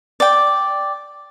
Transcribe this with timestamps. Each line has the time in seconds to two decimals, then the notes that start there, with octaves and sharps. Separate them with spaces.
0.20 D5 G5